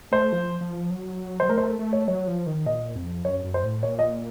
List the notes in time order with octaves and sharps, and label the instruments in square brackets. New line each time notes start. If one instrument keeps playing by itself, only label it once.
[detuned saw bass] A3 [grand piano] C5
[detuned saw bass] F3
F3
F#3
[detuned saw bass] F#3 [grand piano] C5
[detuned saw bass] A3 [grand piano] A#4
[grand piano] C5
A#4
[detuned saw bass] A3
[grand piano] C#5
[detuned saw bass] F#3 [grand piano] C#5
[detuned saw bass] F3
D#3
[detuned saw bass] A#2 [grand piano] D#5
[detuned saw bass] F2
[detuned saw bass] F#2 [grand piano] C#5
[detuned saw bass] F#2
[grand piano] C5
[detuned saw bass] A2
[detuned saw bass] A#2 [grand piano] C#5
[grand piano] D#5